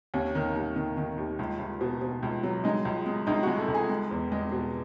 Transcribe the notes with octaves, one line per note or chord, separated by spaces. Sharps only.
D#2 C#4
D#3
D#2
D#3
D#3
D#2
C#2
C#2
B2
B2
C#2
F#3
G#3 D#4
C#2
G#3
C#2 D#4
G#3 F#4
A4
C#2
G#4
G#3
E2
G#3
B2